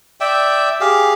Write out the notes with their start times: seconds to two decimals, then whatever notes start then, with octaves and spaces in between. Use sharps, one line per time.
0.20 D5 E5 G5
0.81 G4 G#4 F5